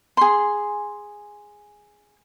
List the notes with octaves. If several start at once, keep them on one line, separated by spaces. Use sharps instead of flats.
G#4 C6